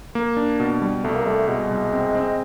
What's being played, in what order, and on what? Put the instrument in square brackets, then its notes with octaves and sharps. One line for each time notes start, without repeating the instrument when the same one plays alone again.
[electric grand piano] A#3
D4
B2
G3
[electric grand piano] C2 [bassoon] A3
[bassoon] A#3
[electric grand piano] G3 [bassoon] A3
[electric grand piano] B2 [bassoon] G#3
[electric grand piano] C2
C4
C4